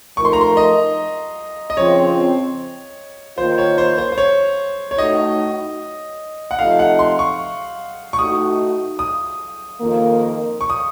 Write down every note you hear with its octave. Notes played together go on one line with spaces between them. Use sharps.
F3 A3 D#4 A#4 C#6
C6
A#5
C6
D#5
D#5
F2 C#3 F3 C4 C#5
D#3 A#3 F4 C5
C#5
C5
C5
C5
C#5
C#5
A2 A3 D#4 F#4 D#5
F#5
F2 C3 F3 A3 D#4 F5
F#5
C6
C#6
C#6
A2 A3 D#4 F#4 D#6
D#6
F2 D#3 A#3
C#6
D#6